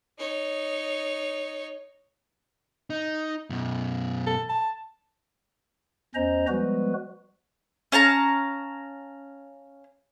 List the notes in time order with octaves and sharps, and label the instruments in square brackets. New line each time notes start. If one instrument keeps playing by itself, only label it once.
[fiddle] D#4 C#5
[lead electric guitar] D#4
F#2 B2
[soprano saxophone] A4
A5
[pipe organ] E2 C#4 C5 D#5 A#5
F3 G3 G#3 B3 F#4 B4
[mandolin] C#4 F5 A5 A#5